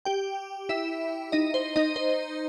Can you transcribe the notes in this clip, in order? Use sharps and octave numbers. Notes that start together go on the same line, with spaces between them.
G4 G5
E4 E5
D#4 D#5
C5
D#4 D#5
C5